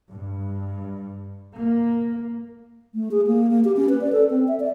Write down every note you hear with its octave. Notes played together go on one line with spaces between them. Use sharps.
G2
A#3
A3
G#4
A#3
A#3
G4
C#4
B4
D5
A4
C4
E5
D5